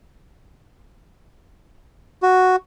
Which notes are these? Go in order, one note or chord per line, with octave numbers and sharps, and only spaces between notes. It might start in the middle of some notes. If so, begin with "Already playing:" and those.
F#4